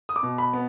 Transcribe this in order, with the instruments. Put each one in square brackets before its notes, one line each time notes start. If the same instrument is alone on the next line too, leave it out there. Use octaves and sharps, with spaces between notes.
[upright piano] D#6
D6
B2
B5
B3